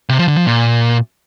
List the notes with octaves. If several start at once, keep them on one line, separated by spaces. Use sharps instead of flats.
C3
F3
D3
F3
A#2